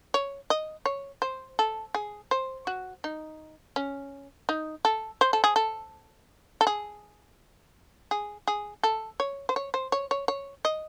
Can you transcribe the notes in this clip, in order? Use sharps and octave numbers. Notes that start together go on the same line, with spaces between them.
C#5
D#5
C#5
C5
A4
G#4
C5
F#4
D#4
C#4
D#4
A4
C5
A4
G#4
A4
A4
G#4
G#4
G#4
A4
C#5
C5
C#5
C5
C#5
C#5
C#5
D#5